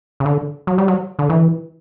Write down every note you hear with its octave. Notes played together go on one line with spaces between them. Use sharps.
C#3
D3
F#3
G3
F#3
D3
E3